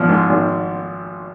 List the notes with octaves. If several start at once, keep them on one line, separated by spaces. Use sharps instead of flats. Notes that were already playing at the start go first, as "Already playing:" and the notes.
Already playing: G#1 F3
G#2
G#1